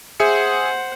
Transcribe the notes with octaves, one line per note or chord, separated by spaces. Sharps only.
G#4 C5 E5 F#5 C#7